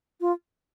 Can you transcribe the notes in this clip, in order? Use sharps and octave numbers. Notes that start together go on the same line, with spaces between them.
F4